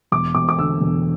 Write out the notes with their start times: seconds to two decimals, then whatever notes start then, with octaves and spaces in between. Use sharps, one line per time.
0.12 E1 D6
0.35 E1 D6
0.49 D6
0.58 D3 E6
0.81 E1